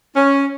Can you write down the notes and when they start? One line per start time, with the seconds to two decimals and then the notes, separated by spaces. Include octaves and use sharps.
0.16 C#4